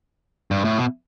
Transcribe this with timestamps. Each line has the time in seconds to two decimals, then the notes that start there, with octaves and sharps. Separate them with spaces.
0.51 G2
0.65 A2
0.78 B2